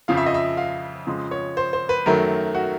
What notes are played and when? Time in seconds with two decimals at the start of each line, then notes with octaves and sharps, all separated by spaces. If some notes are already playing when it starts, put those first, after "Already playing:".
0.08 F2 C#3 F3 F5
0.17 E5
0.26 D#5
0.34 E5
0.57 F5
1.07 F2 C#3 F3 G#3
1.31 C#5
1.57 C5
1.73 C5
1.89 B4
2.06 F#2 D#3 F#3 A3 A#4
2.55 F#4